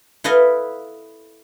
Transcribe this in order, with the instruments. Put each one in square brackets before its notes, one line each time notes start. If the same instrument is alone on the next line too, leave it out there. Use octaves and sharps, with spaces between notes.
[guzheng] E4 A4 B4 D#5 F5